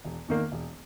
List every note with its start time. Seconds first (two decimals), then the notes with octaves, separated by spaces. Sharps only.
0.04 E1
0.28 E2 D#3 A#3
0.52 E1